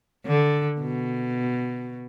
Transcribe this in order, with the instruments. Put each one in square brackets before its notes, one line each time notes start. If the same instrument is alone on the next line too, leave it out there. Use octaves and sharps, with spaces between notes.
[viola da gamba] D3
B2